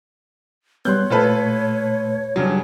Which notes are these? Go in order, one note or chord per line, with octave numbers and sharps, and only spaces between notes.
G3 B3 C#5 C6 F#6 G6
A#2 A3 F4 A4 B4 A5
G2 C#3 F#3